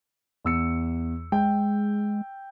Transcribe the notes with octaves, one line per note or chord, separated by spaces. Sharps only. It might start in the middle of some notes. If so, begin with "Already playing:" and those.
E2 E6 C#7
G#3 G5